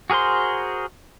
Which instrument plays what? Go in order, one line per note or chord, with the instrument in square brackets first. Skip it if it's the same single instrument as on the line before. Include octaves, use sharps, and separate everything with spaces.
[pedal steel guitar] F#4 G#4 A#4 C5 C6